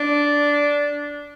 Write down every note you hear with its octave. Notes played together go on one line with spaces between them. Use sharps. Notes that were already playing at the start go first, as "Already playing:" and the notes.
Already playing: D4